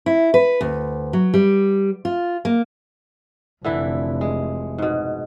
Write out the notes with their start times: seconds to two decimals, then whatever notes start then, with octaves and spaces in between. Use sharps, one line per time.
0.06 E4
0.34 B4
0.61 D2
1.13 F#3
1.34 G3
2.05 F4
2.45 A#3
3.64 F1 D3 E3 E4
4.21 G#3
4.78 G#2 B2